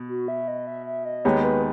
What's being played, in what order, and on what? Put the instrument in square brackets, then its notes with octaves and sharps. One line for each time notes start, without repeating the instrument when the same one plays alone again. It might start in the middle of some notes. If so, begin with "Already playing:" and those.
Already playing: [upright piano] B2
[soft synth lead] F#4
E5
D#5
E5
E5
D#5
[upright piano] D#2 D#3 G#3 B3 D#4 [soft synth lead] C#5
[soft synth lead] B4